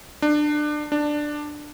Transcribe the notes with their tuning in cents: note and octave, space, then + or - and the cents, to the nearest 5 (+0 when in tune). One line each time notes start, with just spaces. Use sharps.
D4 +25
D4 +10